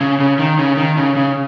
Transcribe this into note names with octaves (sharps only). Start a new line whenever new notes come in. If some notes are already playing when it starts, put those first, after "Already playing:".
C#3
C#3
D#3
C#3
D#3
C#3
C#3